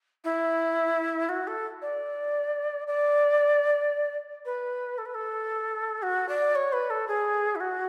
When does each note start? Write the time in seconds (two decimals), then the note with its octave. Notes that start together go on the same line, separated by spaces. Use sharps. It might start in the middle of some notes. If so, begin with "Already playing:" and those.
0.24 E4
1.28 F#4
1.47 A4
1.81 D5
2.87 D5
4.45 B4
4.98 A4
5.05 B4
5.14 A4
6.02 F#4
6.28 D5
6.55 C#5
6.72 B4
6.90 A4
7.07 G#4
7.55 E4
7.60 F#4